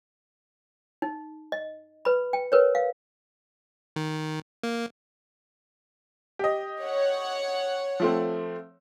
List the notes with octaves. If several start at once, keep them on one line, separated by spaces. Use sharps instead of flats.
D#4
D#5
B4 B5
G5
A#4 B4 C#5
F5
D#3
A#3
G4 D#5
C#5 F#5
F3 A3 C4